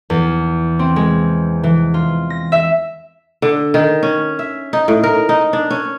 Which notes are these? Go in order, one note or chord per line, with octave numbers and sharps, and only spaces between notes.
E2
C4
G#3
E3
F4
A#6
E5
D3
D#3
C#4
E5
D#4
A2
A#4
D#4
D4
C#4